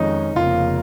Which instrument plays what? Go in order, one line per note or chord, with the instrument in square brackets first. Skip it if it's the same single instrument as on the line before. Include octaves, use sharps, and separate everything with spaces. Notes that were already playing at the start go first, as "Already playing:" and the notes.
Already playing: [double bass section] F2 D#3 G#3 C#4 [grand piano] D#4
[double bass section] F1 F2 C#3 A#3 [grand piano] F4